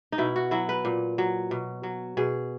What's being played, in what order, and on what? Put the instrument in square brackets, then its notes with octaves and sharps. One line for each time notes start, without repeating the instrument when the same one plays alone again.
[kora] D#4
B2 E4
F#4
F#3 E4
B4
A#2
F#3
B2
F#3
B2 G#4